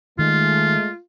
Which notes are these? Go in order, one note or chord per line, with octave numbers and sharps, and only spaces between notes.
D#3 G#3 A3 F4